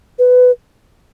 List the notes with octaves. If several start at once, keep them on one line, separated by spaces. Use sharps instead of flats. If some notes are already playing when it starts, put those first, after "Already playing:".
B4